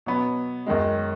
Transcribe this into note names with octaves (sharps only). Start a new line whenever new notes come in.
B2 F#3 B3
F#2 D#3 G#3